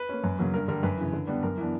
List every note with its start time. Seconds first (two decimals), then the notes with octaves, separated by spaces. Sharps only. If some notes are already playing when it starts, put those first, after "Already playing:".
Already playing: B4
0.09 A#3 C#4
0.24 F#2
0.39 C#3 F#3 A#3
0.54 G2 A#4
0.68 D3 G3 A#4
0.83 F#2 B4
0.98 C#3 E3
1.13 D3
1.27 G3 B3 D4
1.43 F#2 A#4
1.58 E3 B3 D4